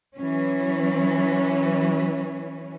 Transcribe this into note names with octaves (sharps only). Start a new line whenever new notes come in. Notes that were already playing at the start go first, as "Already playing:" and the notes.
E3 F#3 C#4